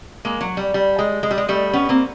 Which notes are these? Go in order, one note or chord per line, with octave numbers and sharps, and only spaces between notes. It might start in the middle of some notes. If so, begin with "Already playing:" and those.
G#3 A#3
F#3
G3
G3
G#3
G#3
G3
G#3
G3 A3
B3 C#4
A#3 C4